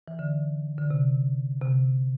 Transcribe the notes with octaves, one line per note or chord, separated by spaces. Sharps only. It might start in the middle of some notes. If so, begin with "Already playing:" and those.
E3
D3
D3
C3
C3